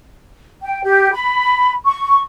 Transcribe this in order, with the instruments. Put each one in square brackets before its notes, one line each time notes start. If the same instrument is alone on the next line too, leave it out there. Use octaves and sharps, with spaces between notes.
[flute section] G5
G4
B5
C#6